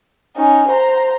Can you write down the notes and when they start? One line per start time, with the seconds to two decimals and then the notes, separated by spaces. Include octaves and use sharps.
0.36 C#4 D#4
0.68 C5 A#5